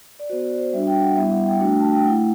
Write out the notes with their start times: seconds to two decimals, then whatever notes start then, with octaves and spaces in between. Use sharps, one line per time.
0.19 D5
0.30 B3 F#4 C5
0.43 D5
0.54 D5
0.58 C5
0.73 G3 D4 F#4 E5
0.87 G5
1.02 F#5
1.16 G3 B3 E4 E5
1.31 F#5
1.46 G5
1.60 A3 D4 F#4
1.80 A5
1.92 G5
2.04 A3 E4 F#5